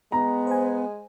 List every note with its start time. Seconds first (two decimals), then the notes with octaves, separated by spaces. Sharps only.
0.12 G#3 B3 A#5
0.47 C5 G#5